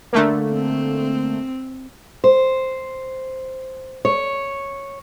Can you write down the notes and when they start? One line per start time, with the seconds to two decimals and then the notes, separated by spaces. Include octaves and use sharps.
0.13 D3 A3 A#3
0.52 C4
2.24 C5
4.05 C#5